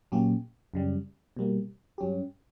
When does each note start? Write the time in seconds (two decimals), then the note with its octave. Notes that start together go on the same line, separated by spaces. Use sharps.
0.12 A#2 F#3 A#3 C#4 G4
0.74 F#2 C#3 G3
1.37 B2 G3 A#3
1.98 G2 F#3 C#4 G4